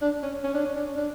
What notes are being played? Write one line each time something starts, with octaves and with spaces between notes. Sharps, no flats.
D4
C#4
C#4
D4
C#4
D4
C#4
D4